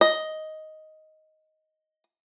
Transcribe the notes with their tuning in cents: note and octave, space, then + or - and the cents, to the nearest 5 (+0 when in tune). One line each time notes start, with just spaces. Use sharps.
D#5 +5